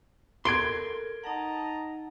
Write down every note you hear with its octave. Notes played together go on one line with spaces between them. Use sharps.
A4 A#4 C6 G#6 D7 G7
D#4 D#5 F#5 A5 A#5